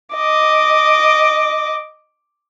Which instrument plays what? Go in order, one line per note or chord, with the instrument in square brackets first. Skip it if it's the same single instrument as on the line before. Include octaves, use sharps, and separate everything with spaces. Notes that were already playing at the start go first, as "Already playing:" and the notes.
[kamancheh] D#5 D6